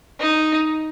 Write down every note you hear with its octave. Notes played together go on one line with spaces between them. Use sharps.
D#4